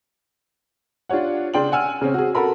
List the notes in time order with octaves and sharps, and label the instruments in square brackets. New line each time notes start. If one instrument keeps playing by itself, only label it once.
[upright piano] D4 F4 G4 C#5 F#5
C#3 D4 G5 C6 F#7
F#5 G#5 E6 F6
C#3 C4 C#4
F#4 G#4
F#4 A4 A#4 B5